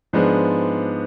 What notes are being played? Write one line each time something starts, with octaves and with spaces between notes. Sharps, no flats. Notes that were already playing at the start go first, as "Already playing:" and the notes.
G#2 F3 G#3 B3 D4